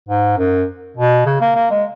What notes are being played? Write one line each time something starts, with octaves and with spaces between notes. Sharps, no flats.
G#2
F#2
B2
C#3
A#3
A#3
G#3